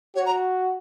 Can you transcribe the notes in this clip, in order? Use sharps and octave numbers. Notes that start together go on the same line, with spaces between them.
F#4 C#5
A#5